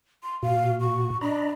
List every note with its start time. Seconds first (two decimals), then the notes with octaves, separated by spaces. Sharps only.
0.23 C6
0.43 A#2 F#4 F5
0.81 C#6
1.21 D4 D#5 A#5 B5